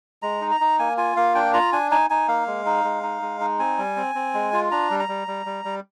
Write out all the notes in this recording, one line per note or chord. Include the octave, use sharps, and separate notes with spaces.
G#3 A#5
D#4
A#5
D#4
A#3 G#5
F4 G#5
A#3 F5
D4 G5
F4 A#5
D4 G#5
D#4 G#5
D#4 G#5
A#3 F5
G#3
D#4
G#3
D#4
G#3
D#4
C4 G#5
G3
C4
C4
G#3
F4
D4 A#5
G3
A#5
G3
G3
G3
G3